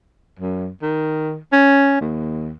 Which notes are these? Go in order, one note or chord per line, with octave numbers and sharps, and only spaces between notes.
F#2
D#3
C#4
D#2